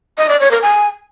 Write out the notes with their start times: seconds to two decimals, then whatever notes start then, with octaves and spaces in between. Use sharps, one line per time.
0.18 D#5
0.29 D5
0.40 C#5
0.51 A#4
0.62 G#5